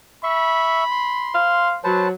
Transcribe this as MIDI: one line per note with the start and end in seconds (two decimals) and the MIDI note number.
0.23 0.84 76
0.23 1.59 83
0.23 0.84 85
0.91 1.68 84
1.34 1.75 72
1.34 1.75 77
1.84 2.11 54
1.84 2.08 71
1.84 2.08 72
1.84 2.08 81